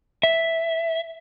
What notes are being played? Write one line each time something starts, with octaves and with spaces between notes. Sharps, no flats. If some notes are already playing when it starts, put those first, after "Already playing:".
E5